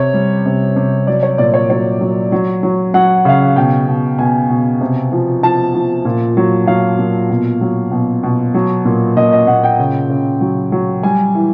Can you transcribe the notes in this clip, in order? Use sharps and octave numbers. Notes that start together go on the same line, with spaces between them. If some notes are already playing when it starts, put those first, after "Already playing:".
Already playing: C3 C#5
G3
C3
C3
F#3 D5
C#5
A#2 D5
C#5
F#3 C#5
F#3
F#3
F#3
F#3 F#5
C#3 F5
F#5
B2 G5
B2
B2 G#5
B2
C3
F3
F3 A5
F3
A#2
F#3
F#3 F5
A#2
B2
F#3
B2
B2
F#3
A#2
A#2 D#5
D#5
A#2 F#5
G5
C#3
C#3
F#3
F#3
G3 G#5
E3